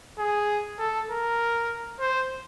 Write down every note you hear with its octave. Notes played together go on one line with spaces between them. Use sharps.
G#4
A4
A#4
C5